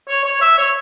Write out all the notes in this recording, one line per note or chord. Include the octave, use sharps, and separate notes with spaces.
C#5
C#5
E5
C#5